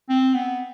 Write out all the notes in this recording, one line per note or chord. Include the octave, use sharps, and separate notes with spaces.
C4
B3